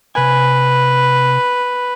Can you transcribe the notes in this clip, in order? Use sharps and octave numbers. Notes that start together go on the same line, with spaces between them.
C3 B4 G#5